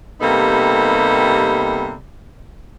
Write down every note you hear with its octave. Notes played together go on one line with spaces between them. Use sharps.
C3 G3 A#3 B3 D#4 A4